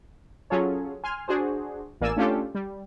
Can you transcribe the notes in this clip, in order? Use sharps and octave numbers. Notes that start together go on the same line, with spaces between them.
F#3 C#4 F4 G#4 A4 C#5
G#5 C6 F6
D4 F#4 G#4 C5
A1 A#3 D5 G#5 E6 E7
A3 C#4 D4 F4 G4 A4
G3